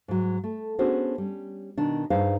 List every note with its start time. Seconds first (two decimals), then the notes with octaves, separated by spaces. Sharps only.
0.08 G#2 F#3
0.44 A3
0.79 B3 C#4 D4 F#4 G#4 C5
1.18 G3 C#4
1.78 B2 D#3 D4
2.10 G2 D#4 G#4 C5 F5